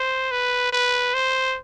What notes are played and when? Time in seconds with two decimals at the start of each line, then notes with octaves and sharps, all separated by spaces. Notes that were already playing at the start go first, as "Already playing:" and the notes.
Already playing: C5
0.31 B4
0.72 B4
1.14 C5